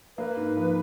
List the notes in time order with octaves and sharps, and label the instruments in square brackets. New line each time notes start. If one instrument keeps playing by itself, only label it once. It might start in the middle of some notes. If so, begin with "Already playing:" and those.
[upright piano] A#3 [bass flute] B4
[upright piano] G#2
F3